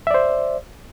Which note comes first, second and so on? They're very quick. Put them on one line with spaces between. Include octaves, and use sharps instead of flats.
E5 D5 C5